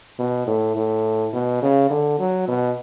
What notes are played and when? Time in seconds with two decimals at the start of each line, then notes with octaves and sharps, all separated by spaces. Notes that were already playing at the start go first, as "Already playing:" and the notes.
0.19 B2
0.47 A2
0.76 A2
1.33 B2
1.62 C#3
1.90 D3
2.19 F#3
2.48 B2